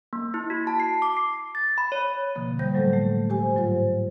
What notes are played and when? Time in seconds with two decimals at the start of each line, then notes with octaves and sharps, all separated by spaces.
0.13 A#3
0.34 E4
0.50 F#4
0.67 A5
0.80 C7
1.02 D6
1.17 C7
1.55 A6
1.78 B5
1.92 C#5
2.35 B2 D3 F3 A#3
2.59 G3 C5 G6 A#6
2.73 A2 F#3 A3 A4
2.93 A3
3.30 G4 C5 G#5
3.55 G#2 F#3 F4 C5